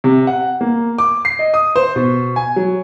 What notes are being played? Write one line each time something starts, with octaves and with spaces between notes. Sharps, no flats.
C3
F#5
A#3
D6
C7
D#5
D#6
C5
B2
G#5
F#3